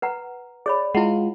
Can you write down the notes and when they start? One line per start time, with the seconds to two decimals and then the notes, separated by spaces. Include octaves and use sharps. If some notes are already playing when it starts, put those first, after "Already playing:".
0.02 B4 F#5 A#5
0.66 G#4 C#5 D5 B5
0.95 G#3 E4 F4 F#5